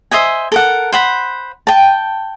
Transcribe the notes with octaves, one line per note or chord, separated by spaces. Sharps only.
C5 D#5 E5 G#5
A4 A#4 F#5
C5 F#5 B5
G5 A5